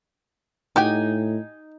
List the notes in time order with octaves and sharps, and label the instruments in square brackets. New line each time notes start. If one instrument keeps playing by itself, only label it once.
[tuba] A2 [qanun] D#4 G#5 [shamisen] F#4 G4 G5